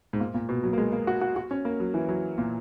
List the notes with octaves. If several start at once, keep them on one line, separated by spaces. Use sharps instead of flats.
G#2
A#2
A#2
B2
F#3
A#3
G#3
A#3
F#4
F#4
F#4
C#4
A#3
F#3
E3
F#3
A#2